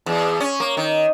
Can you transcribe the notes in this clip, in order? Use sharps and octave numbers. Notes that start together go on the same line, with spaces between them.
E2
C#4
A#3
D#3